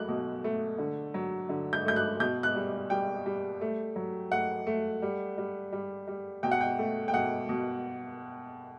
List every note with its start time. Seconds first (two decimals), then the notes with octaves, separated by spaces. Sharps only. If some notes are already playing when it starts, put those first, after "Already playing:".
Already playing: F#3 A3 F#6
0.08 B2
0.44 A3
0.78 D3
1.14 F#3
1.49 D3
1.73 G6
1.85 A3 G6
1.96 F#6
2.20 B2 G6
2.43 F#6
2.56 G3
2.90 G3 G5
3.26 G3
3.61 A3
3.96 F#3
4.32 A3 F#5
4.67 A3
5.02 G3
5.38 G3
5.72 G3
6.08 G3
6.43 B2 G5
6.52 F#5
6.61 G5
6.79 A3
7.08 G5
7.14 B2 F#5
7.49 B2